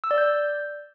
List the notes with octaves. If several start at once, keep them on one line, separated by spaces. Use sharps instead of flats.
E6
D5
G6